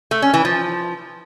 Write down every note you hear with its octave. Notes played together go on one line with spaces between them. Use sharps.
A3
C#4
E3
F3